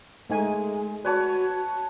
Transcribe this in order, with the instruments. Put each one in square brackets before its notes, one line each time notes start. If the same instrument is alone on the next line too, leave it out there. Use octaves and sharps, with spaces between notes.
[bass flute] G#3 [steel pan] A3 D#4 G#5
[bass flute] F#4 [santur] B4 C#5 A5 [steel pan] D5